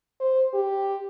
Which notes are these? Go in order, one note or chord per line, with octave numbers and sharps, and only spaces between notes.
C5
G4